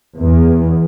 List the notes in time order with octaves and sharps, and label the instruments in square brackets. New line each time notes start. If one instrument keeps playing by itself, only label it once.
[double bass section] E2